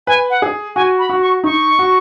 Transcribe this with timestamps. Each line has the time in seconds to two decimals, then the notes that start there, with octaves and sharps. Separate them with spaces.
0.07 B4 G#5
0.30 F#5
0.42 G#4
0.75 F#4 G#5
0.99 B5
1.09 F#4
1.21 C#6
1.44 D#4 C#6
1.79 F#4